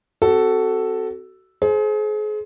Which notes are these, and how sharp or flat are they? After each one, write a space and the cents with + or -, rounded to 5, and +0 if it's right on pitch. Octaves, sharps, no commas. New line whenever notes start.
C4 +0 F#4 +25 A4 +0
G#4 +35 C5 +0